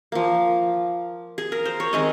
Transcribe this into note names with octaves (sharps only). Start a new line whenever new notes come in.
F3 A#3
G#4
A#4
C5
C#5
D#3 G#3 C4 D#5